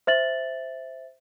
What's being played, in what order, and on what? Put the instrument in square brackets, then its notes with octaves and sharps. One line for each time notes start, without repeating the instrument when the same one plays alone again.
[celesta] C5 E5 A6 F#7